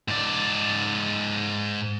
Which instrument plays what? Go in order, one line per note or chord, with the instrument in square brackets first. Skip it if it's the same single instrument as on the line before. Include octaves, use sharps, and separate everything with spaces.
[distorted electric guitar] G#2 D5